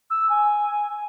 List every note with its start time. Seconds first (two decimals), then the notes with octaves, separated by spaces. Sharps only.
0.10 E6
0.29 G#5